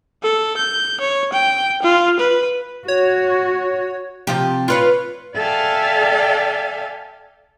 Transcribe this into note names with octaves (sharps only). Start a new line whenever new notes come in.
A4
G6
C#5
G5
F4
B4
F#4 C#5
C3 F3 G4
F4 B4 C#5
A4 D5 E5 F5 G5 G#5